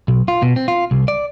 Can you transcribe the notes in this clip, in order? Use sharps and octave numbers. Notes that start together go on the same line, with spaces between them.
B1
F4
B2
C4
F4
C2
D5